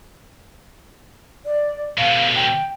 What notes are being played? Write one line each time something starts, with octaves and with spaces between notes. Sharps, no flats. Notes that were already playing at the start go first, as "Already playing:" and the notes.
D5
B2 D3 F5
G5